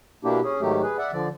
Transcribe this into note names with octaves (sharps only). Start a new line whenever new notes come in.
B2 A#3 D4 E4 G4
C#4 G#4
G#2 D#3 F#3 A3 G4
G#4 B4
D5 E5 F#5
D3 F3 D5